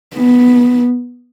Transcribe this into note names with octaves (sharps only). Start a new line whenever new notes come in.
B3